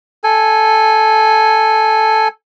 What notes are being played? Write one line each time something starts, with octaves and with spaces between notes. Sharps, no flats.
A4 G#5